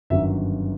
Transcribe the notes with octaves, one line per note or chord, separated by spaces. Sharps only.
G1 F#2 D#3 F#3 E5